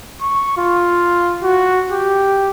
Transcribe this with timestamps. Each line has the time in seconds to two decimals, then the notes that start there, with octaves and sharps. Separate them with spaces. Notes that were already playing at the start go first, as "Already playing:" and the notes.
0.21 C#6
0.57 F4
1.43 F#4
1.91 G4